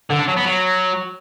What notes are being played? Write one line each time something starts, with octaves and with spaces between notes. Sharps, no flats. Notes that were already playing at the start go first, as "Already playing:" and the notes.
D3
D4
F#3
B3
F#3